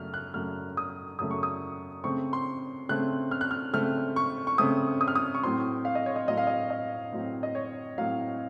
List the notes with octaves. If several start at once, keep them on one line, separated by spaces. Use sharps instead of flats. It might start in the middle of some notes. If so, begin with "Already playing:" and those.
Already playing: F#2 C#3 A3 F6
F#6
F#2 C#3 A3 F6
D#6
F#2 C#3 A3 D#6
C#6
D#6
C#3 A3 C4 C#6
C6
C#3 A3 C4 F#6
F6
F#6
F6
C#3 A3 C4 F6
C#6
C#6
C#3 A3 C4 D#6
D#6
F6
D#6
C#6
A2 F#3 C4 C6
F5
D#5
C#5
D#5
A2 F#3 C4 D#5
F5
D#5
D#5
A2 F#3 C4
D#5
C#5
A2 F#3 C4 F5